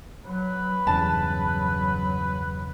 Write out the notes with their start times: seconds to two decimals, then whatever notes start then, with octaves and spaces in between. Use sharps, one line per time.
0.25 F#3 B4
0.87 E2 G2 C#3 F#3 A5